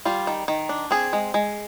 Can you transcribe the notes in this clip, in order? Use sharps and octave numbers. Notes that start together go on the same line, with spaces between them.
G3 F4
D#3
D#3
D4
C4 G#4
G#3
G#3